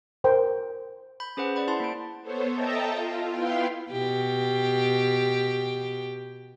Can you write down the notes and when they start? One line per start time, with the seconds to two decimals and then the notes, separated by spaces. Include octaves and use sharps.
0.24 A#4 C5 G5
1.20 B5 G6
1.37 C#4 G#4 B4 C5 F#5
1.56 C5 D5 F#5 B5
1.68 E4 A5 C6
1.80 A#3 F#5 D7
2.22 B3 A4 C5 C#5
2.53 A4 D#5 E5 G5 A5 A#5
2.90 F4
3.31 B3 E4 F5 G5 C6
3.92 B2 G4